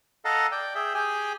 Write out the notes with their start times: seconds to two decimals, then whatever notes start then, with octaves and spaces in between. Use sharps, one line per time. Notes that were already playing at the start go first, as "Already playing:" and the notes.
0.25 A4 D#5 F5 F#5 A5 A#5
0.52 D5 G5
0.75 G#4 E5 G5
0.95 G4 G#4 G5 G#5